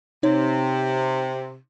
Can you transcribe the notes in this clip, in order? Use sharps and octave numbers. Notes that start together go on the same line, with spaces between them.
C3 D#4 C#5